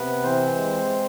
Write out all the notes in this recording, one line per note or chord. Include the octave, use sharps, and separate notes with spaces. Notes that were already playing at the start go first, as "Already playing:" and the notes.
Already playing: C3 B3 B4
E3 C4 C5
G#3